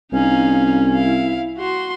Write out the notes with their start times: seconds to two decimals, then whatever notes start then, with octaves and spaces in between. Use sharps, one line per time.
0.12 C2 C#4 D#4 F5
0.94 E4 F5
1.58 F#4 C6